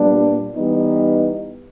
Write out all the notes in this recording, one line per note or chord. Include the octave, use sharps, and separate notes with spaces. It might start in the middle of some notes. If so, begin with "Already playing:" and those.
Already playing: A#2 G3 B3 D4
E3 G3 B3 D#4